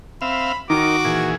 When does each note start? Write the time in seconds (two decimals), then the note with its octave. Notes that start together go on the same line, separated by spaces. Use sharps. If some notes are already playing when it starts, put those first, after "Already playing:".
0.22 C4 E5 F5 B5
0.70 D#3 D#4 F#4 A#4 D6
1.05 A#2 E3 G#4